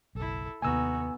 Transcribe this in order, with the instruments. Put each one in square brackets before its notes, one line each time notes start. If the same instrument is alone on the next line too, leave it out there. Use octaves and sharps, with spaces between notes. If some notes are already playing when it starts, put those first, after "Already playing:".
[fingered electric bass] F#1 B1 [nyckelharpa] E4 A4
[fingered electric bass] D#2 C3 A#3 [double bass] B3 [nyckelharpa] D#4 F#4 [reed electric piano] G#5 E6